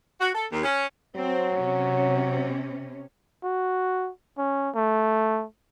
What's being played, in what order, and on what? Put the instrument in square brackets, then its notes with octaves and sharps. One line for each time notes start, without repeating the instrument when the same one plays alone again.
[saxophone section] F#4
A4
D#2
C#4
[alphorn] F#3 [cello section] C4
[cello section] C3 C#4
[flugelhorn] F#4
C#4
A3